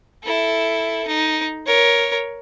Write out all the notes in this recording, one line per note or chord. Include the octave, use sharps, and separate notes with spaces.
E4 A4
D#4
A#4 C#5